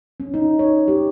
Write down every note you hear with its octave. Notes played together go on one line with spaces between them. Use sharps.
C#4
D#4
C#5
G4